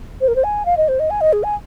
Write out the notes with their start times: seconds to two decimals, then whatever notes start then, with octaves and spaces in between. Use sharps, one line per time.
0.21 C5
0.28 A#4
0.36 C5
0.44 G#5
0.66 F5
0.77 D#5
0.88 C5
1.00 D#5
1.10 G#5
1.21 D#5
1.33 G#4
1.43 G#5